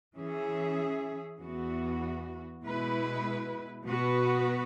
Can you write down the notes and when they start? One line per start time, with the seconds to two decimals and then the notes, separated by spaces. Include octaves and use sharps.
0.15 E3 C#4 G#4 E5
1.39 E2 E3 B3 F#4
2.63 B2 G#3 E4 B4
3.85 B2 B3 F#4 B4